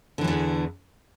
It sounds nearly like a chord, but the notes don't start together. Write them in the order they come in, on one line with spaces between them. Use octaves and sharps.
D3 E3 G#2 E2